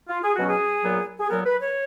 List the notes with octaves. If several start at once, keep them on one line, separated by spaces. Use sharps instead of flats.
F4
G#4
B2 F#3 C#4 F#4
G#4
A#2 F#3 B3
G#4
A#2 F#3 B3 A#4
B4
C#5